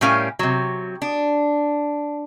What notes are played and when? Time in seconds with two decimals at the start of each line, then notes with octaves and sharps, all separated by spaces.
0.01 A2 G3 C#4 A#4 F5 G#5
0.39 C3 F#3
1.02 D4